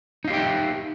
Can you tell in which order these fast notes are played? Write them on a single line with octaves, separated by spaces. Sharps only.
D#4 F5 G4 G5 E5